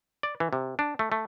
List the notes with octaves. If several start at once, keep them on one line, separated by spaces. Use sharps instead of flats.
D5
E3
C3
D4
A3
A3